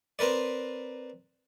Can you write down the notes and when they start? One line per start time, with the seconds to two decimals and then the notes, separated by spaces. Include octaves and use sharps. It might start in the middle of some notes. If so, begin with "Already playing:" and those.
0.19 C4 A#4 B4 D5